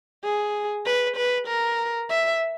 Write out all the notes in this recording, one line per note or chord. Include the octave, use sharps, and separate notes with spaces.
G#4
B4
B4
A#4
E5